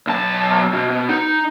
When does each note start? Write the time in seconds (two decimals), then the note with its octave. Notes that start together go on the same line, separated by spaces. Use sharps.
0.07 B1 A5
0.73 B2
1.09 D#4